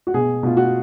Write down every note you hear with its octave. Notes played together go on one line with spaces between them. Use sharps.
F#4
B2 G#4
B2 F4
F#4